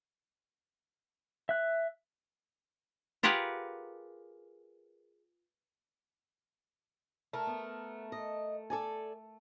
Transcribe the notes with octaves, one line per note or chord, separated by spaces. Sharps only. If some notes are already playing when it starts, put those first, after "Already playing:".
E5 F#6
F4 G4 G#4 A#4 B4 F#5
A3 A#4
B3
D#5
A4 D5 G#5